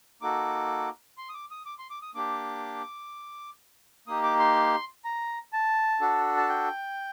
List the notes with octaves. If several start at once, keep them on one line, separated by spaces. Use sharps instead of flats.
A#3 D#4 F#4 A4 D6
C6
D#6
D6
D#6
D6
C6
D6
D#6
A#3 D4 G4 D6
A#3 D#4 G4 D#6
D6
C6
A#5
A5
D4 F#4 A4
A5
G5